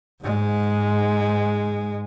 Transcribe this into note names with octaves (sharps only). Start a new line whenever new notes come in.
G#2 G#3